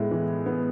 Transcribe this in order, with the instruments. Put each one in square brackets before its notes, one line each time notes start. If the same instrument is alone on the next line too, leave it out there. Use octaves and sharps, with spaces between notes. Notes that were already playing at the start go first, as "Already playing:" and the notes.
Already playing: [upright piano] A2 G#3 B3
E3
B3